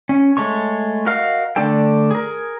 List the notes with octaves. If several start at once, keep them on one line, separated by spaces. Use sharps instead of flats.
C#4
G#3 A3 C#5 C#6
F#4 A#4 D#5 F5 F6
D3 A3 D4 A4 G5
G#4 A#4